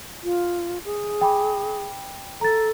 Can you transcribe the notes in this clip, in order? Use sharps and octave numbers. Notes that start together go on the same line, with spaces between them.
F4
G#4
G5 B5 D6
A4 A#5 A6